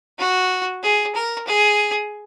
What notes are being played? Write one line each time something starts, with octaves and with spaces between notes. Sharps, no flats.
F#4
G#4
A#4
G#4